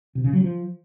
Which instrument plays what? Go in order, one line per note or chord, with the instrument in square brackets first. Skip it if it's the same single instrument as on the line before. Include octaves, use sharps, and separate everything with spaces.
[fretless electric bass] C3
C#3
F#3
F3